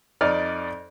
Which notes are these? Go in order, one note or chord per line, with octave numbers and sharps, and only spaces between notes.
F2 D#4 D5 D#5 F6